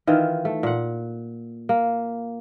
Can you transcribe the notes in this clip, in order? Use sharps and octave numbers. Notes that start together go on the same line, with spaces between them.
D#3 E3 F4
A3
A#2 F#5
A#3